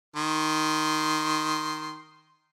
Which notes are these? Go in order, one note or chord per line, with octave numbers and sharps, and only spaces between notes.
D#3 C6